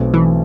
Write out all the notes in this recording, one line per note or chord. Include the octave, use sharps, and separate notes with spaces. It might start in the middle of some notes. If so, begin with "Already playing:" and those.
Already playing: B1 B2 A3 C4
E3